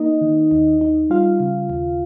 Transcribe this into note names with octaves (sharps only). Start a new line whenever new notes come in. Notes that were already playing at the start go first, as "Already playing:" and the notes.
Already playing: A#3 D#4 D#5
D#3
D#2
D#4
G3 F4 F5
C#3
D#2